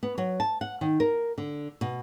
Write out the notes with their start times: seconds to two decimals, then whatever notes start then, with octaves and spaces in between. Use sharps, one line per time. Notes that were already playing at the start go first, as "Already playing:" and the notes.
0.03 B3
0.18 F#3
0.40 A5
0.61 F#5
0.81 D#3
1.00 A#4
1.38 D3
1.81 B2